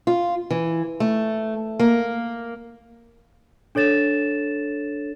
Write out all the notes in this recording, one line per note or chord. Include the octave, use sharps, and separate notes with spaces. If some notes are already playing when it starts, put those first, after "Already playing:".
F4
E3
A3
A#3
D4 A4 C#5 A6 E7